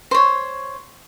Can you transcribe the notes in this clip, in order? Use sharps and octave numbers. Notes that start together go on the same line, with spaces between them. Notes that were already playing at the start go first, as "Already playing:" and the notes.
C5 C#5